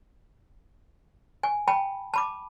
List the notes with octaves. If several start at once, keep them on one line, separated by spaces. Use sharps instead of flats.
G#5
G5 A5 B5
A5 B5 D6